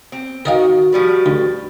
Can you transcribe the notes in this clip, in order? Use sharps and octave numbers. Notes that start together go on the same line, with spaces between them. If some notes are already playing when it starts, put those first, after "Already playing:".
C4
D#3 F#4 A#4 D#5 F5
F3 G3 B4
D2